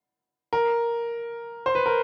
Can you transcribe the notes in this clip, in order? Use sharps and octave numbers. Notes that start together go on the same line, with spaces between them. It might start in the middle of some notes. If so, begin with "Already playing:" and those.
A#4
C5
B4
A#4